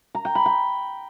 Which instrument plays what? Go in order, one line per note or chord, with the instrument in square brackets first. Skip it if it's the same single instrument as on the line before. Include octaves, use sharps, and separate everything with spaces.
[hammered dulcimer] A#5
G5
B5
G5